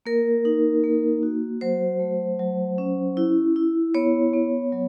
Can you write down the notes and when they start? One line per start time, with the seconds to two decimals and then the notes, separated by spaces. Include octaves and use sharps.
0.06 A#3 A#4
0.45 D#4
0.84 A#3
1.23 F#4
1.61 F#3 C5
2.00 A3
2.39 F#3
2.78 C#4
3.17 E4
3.56 E4
3.95 B3 C#5
4.34 B3
4.72 F#3